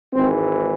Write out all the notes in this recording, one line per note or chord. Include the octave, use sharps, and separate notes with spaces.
G#1 G#2 E3 C4